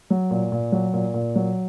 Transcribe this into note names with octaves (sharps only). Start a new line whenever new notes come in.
F#3
A#2
A#2
F#3
A#2
A#2
F#3